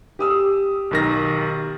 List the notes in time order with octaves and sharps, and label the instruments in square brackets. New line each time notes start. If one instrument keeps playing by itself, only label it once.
[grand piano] G4 D#6 E6
[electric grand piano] B1 D#3 A#6